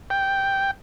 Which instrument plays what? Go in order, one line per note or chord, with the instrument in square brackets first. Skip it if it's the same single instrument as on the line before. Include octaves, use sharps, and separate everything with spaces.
[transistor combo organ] G5